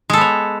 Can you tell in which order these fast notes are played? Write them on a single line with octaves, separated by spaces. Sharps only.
G#3 A4 B3 C#5